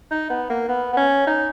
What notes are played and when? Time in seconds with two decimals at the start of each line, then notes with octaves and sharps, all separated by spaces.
0.11 D#4
0.30 B3
0.50 A#3
0.68 B3
0.93 B3
0.97 C#4
1.27 D#4